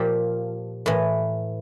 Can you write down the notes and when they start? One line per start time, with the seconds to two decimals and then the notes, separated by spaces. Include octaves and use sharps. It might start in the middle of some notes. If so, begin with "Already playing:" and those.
Already playing: A#2 F3 G4
0.86 A2 E3